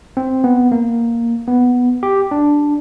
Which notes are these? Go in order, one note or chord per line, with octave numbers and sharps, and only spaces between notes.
C4
B3
A#3
B3
G4
D4